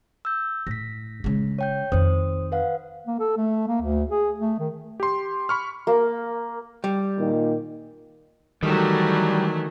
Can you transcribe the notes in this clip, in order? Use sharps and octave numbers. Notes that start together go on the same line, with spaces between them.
E6 G6
A2 A#6 B6
C#3 G#3
C#5 G5 G6
F2 D#3 C5 D#6
B4 F5 F#5
A#3
A4
A3
A#3
D2
G#4
A3
D#3
G4 C6
B5 C#6 F6
A#3
G3
A#2 D#3
D#3 E3 F#3 G3 A3